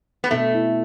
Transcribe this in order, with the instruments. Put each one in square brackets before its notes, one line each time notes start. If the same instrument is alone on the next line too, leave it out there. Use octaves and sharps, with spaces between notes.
[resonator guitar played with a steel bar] B3
[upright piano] B2 [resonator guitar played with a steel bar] A3
[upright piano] E4